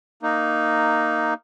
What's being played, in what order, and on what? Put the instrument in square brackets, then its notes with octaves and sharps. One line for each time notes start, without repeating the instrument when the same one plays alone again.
[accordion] A#3 D#4